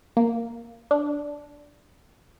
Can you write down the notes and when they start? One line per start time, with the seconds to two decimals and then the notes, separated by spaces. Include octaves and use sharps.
0.17 A#3
0.91 D4